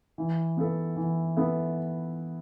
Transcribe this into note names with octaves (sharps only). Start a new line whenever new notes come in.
E3
B3 E4 A4
E3
B3 E4 A4